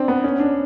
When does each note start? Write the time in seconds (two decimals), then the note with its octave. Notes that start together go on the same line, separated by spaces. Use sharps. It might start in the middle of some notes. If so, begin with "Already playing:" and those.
Already playing: C4 D4
0.08 B3
0.24 C#4
0.40 D4